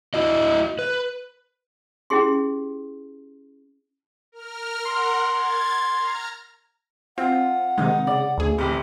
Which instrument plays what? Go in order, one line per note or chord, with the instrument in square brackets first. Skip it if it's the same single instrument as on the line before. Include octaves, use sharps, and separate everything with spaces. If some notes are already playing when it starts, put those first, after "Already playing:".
[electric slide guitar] E4 F#4 D#5
B4
[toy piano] C#4 E4 G4 G#4 C6
[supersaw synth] A#4 F6
[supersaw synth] A#4 F#5 [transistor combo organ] C6
[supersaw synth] G#6 A6
A#5 F6
[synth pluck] C4 [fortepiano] F4 [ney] F#5
[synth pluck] C3 D#3 G#3 [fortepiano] D#4
[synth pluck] C#3 [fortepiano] D5
[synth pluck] D2 G#4 [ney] A3
[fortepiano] A1 C3 [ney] G5